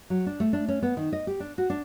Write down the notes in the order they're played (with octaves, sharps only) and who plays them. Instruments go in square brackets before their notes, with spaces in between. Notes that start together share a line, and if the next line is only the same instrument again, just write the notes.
[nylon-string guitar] F#3
D4
A3
D4
C#4
B3
D#3
D#5
G4
D4
F#4
D4